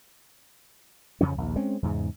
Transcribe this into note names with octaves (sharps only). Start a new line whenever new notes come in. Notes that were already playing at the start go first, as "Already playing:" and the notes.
F2 C#3 F3 C#4
A#1 D#2
G#3 C4 C#4
E2 G#2 C#3